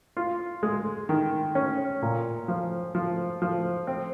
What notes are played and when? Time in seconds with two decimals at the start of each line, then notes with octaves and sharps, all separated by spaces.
0.17 F4
0.63 G#3
1.09 D#3
1.55 C#4
2.02 A#2
2.48 F3
2.95 F3
3.42 F3
3.87 C4